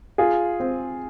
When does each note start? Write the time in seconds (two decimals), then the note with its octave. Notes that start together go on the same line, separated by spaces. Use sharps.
0.18 F4 G#4
0.60 C4